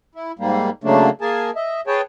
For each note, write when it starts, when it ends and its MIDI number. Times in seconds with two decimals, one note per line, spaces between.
0.15 0.32 64
0.39 0.70 44
0.39 0.70 55
0.39 0.70 58
0.84 1.10 49
0.84 1.10 54
0.84 1.10 57
0.84 1.10 58
0.84 1.10 62
1.21 1.51 58
1.21 1.51 68
1.21 1.51 70
1.21 1.51 80
1.21 1.51 81
1.56 1.81 75
1.56 1.81 76
1.87 2.01 68
1.87 2.01 71
1.87 2.01 73
1.87 2.01 79
1.87 2.01 81